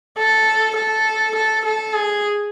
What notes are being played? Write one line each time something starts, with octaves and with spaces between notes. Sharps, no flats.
A4
A4
A4
A4
G#4